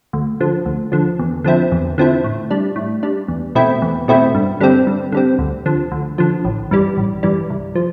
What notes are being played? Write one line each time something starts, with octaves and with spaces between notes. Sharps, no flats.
D2
D3 F3
D2
D3 F3
E2
D3 F3 C4 E4
E2
D3 F3 C4 E4
A2
G3 D4
A2
G3 D4
E2
B2 A3 C4 E4
E2
B2 A3 C4 E4
G2
D3 G3 C4
G2
D3 G3 C4
D2
D3 F3
D2
D3 F3
A1
G2 E3 G3
A1
G2 E3 G3
C2
F3